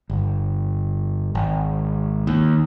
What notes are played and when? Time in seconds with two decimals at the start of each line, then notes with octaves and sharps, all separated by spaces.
0.10 G1
1.35 G#1
2.27 D#2